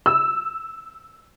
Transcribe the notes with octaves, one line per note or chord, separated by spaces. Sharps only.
E6